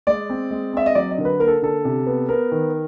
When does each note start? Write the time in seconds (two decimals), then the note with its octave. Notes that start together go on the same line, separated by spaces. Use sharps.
0.07 G#3 D5
0.30 C4
0.51 G#3
0.73 C4 E5
0.86 D#5
0.95 F#3 D5
1.10 D#5
1.18 D3 A#4
1.25 B4
1.39 A#3 A#4
1.48 A4
1.62 D3 A4
1.85 C3
2.07 B3
2.29 B3 A#4
2.52 D#3